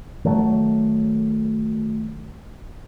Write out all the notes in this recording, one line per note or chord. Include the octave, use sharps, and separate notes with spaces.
D#3 F#3 A3